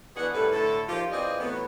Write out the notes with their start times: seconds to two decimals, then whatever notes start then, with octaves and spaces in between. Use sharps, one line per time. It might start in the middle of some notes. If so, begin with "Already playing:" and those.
0.16 B2 E3 D4 G#4 F#5
0.33 F#2 A2 C3 G3 A4 B4
0.51 A2 D3 E4 A4
0.87 D#2 F3 F4 G4
1.11 E3 C4 F4 G#4 D5 D#5
1.38 A2 E3 F#3 B3